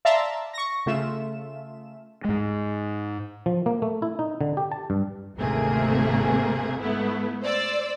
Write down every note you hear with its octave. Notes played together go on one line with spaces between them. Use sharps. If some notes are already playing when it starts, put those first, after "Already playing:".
D5 E5 F5 A5 A#5 C6
C#6 A#6
C#3 A3 F4 E5 E7
G#2 G#3
F3
A#3
A3
E4
D#4
D3
G4
A5
G2
G#1 D2 C3 A3 A#3 G#4
G#2 A3 B3 E4
C5 D5 E6